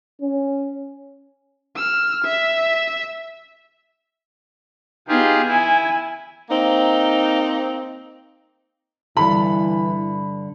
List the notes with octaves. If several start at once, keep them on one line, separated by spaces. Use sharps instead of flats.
C#4
E6 F6
E5
B3 D#4 F4 G4 G#4
E4 G#5
A#3 C4 D#4
G2 D3 E3 B5